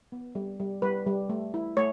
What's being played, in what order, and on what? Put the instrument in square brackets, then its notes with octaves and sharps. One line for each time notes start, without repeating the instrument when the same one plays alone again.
[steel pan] B3
G3
G3
G3 B4
G3
A3
E4
A3 C#5